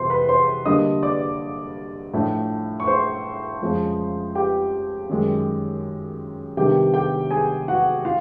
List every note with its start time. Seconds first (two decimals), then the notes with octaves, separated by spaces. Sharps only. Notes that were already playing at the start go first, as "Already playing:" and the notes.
Already playing: F2 C3 E3 C5 C6
0.10 B4 B5
0.29 C5 C6
0.65 D3 G3 A#3 D4 D#5 D#6
1.03 D5 D6
2.13 A2 F3 A3 D4
2.80 C#6
2.87 C5 C6
3.62 F2 C#3 F3 G#3
4.35 G4 G5
5.09 F#2 D#3 G#3
6.57 C3 D#3 G3 B3 D4 G4 G5
6.94 G4 G5
7.31 G#4 G#5
7.68 F#4 F#5
8.05 F4 F5